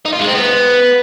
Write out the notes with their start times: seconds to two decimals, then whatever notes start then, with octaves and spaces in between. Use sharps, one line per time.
0.06 D#4
0.13 F4
0.20 G#3
0.28 C4
0.35 B3